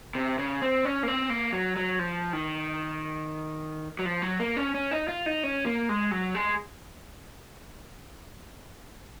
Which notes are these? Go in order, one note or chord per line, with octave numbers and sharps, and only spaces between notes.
C3
C#3
C4
C#4
A#3
C4
A#3
F#3
F#3
F3
D#3
F#3
F3
F#3
A#3
C#4
C#4
D#4
F4
D#4
C#4
A#3
G#3
F#3
G#3